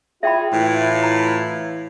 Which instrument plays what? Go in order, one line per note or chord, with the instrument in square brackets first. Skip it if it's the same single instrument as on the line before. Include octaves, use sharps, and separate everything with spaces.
[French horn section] E4 F4 [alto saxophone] G#4 [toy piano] E5 G5 B5
[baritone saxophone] A2 [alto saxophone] E3
[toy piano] A#5